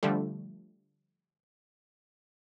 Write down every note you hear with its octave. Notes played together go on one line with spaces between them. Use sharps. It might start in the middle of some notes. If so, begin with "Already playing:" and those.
D3 F3 G3 A3